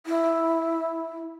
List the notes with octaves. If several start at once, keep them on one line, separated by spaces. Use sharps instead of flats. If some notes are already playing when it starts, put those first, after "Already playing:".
E4